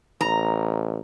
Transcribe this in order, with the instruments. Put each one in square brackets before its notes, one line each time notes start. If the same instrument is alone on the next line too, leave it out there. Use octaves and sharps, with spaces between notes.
[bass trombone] A1 [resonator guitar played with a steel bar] A#5